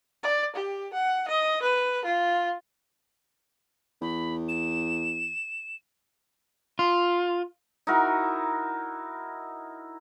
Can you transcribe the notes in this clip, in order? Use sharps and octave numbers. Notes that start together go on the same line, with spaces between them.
D5
G4
F#5
D#5
B4
F4
E2 B5
E7
F4
D#4 E4 F#4 A#4